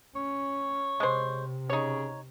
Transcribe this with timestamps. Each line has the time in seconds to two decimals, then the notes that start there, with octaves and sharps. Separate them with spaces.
0.16 C#4 C#5
1.00 C3 G#3 C5
1.70 C#3 D#4 C#5